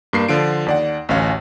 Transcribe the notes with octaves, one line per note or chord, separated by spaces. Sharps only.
G2 A#3 C7
D3 F3 F4 D7
D#2 D5 F#5
A1 D2 C#4 C#5 F5